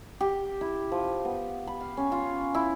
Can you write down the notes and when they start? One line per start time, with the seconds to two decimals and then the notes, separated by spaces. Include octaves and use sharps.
0.21 G4
0.61 E4
0.92 F3
1.25 B3
1.67 B5
1.81 F5
1.97 C#4
2.12 F4
2.54 E4